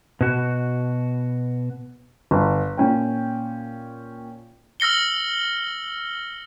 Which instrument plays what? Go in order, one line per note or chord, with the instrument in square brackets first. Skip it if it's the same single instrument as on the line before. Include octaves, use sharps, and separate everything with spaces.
[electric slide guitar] B2 F#4
[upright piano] G1
A#2 C#4 G5
[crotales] E6 F6 A#6 C#7 G7